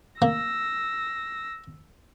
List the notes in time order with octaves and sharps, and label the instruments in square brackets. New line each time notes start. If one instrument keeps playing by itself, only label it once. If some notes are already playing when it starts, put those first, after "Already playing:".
[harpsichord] A#3 [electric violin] E6 A#6